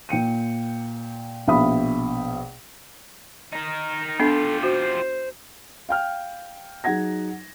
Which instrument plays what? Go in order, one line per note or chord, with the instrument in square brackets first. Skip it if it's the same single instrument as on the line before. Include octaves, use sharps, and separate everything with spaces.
[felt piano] A#2 G5 C#7 D#7
A#1 B2 E5 F5 B5 D#6
[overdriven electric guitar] D#4 A#4
[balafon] B3 D4 [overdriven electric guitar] F4 G4 [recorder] A4
[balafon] F#4 [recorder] C5
[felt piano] F5 G5 F6
F#3 D#4 G#4 F#5 G#6 A#6